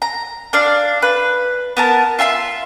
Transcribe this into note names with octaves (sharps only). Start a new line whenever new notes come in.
A#5
D4 D5 F5
B4
B3 A#4 A5
F4 E5 A5 C6